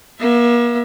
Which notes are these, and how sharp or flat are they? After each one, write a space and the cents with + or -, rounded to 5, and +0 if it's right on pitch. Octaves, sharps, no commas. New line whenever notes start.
A#3 +40 E5 +25